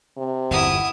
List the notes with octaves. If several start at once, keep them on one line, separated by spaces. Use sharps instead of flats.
C3
G1 E2 E4 F#5 D#6